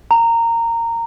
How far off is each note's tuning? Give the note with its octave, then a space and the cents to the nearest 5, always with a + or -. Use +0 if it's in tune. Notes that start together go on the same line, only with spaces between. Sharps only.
A#5 -15